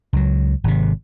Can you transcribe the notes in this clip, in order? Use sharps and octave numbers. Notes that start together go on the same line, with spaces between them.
C#2 F#3
G#1 C3